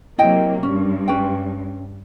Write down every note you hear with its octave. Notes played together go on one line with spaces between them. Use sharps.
C3 F#3 A#3 E4 D#5 G5
G2 C#4
C#4 B4 G5